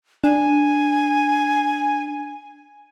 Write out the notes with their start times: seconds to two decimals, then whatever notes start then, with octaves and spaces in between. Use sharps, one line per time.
0.24 D4 G#5